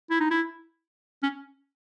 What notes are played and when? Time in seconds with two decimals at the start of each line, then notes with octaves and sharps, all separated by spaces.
0.10 E4
0.20 D#4
0.31 E4
1.23 C#4